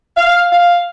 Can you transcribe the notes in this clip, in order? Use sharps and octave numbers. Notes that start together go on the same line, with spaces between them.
F5
F5